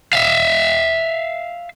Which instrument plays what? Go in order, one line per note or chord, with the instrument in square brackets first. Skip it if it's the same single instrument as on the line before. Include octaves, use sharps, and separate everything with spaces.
[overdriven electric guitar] E5 F5